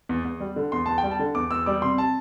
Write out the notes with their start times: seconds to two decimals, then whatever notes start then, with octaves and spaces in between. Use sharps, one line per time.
0.09 E2
0.25 E2
0.40 G3
0.56 D3
0.72 E2 C6
0.86 E2 A5
0.98 G5
1.03 G3
1.11 A5
1.19 D3
1.35 E2 D6
1.51 E2 E6
1.66 G3 D6
1.82 C3 C6
1.98 A5